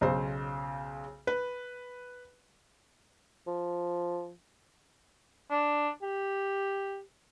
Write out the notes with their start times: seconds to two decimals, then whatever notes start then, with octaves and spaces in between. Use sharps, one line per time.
0.01 B1 C#3 C5
1.27 B4
3.47 F3
5.51 D4
6.02 G4